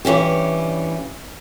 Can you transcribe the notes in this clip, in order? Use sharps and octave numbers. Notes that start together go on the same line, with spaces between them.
G2 E3 C#4 G4